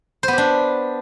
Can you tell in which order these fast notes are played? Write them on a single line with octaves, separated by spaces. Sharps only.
C5 B3 G4 D4